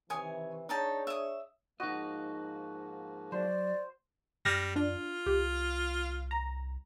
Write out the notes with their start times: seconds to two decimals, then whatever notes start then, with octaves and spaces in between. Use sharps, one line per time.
0.10 C3 D#3 E3 C#5 G#5 D#6
0.69 D4 D#4 G#4 C#5 G5 A5
1.07 E5 D#6
1.80 G#2 F3 A#3 D#4 F#4 D#5
3.32 F#3 C5 D5
4.45 F#2 G3 F6 A#6
4.76 D4 F4
5.26 C2 G4
6.31 A#5